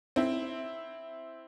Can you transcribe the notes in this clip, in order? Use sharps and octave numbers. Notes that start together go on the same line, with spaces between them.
C4 E4